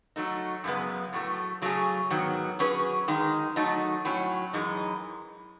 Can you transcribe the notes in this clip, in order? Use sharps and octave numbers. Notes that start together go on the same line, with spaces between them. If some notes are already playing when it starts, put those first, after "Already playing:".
F#3 A3 D#4
F#2 C#3 G#3 B3
A2 F#3 A3
C#3 F#3 A3 C#4 G#4
G#2 D#3 F#3 B3
F#3 C#4 G#4 B4
D#3 G#3 D#4
F#3 A3 D#4 A4
A2 F#3 C#4
F#2 E3 G#3 D#4